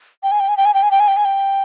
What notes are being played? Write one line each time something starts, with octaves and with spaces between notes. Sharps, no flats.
G5
G#5
G5
G#5
G5
G#5
G5
G#5
G5
G#5
G5
G#5
G5